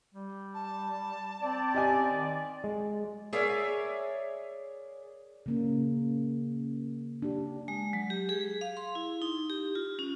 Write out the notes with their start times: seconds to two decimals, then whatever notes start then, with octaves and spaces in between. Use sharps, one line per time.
0.14 G3
0.54 A5
1.42 C4 D5
1.74 G4 D#5 G#5
2.12 D#3
2.64 G#3
3.33 G#4 A#4 C#5 D5 E5 G#5
5.46 C#3 A#3 C#4
7.22 D4 G4
7.68 G#3
7.93 F#3
8.10 G4
8.29 G#4
8.61 F5
8.77 C6
8.95 E4
9.22 D#4
9.50 G4
9.75 F4
9.99 C#4